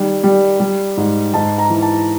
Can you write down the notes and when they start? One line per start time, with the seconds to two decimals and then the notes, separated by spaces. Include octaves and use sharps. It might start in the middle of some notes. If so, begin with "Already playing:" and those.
Already playing: D#3 G3
0.23 G3
0.59 G3
0.97 G#2
1.34 G#2 A5
1.58 A#5
1.70 E3
1.82 A5